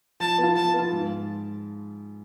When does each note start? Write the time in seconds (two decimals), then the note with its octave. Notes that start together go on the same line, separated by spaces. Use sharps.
0.20 F3 A5
0.38 B3 F4
0.56 F3 A5
0.74 B3 F4
0.92 G#2